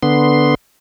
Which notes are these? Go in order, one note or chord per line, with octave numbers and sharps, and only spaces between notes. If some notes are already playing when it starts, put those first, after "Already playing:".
D3 B3 C6